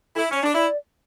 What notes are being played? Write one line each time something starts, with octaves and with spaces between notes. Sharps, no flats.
E4 A4
C#4 C#5
D4
E4 D5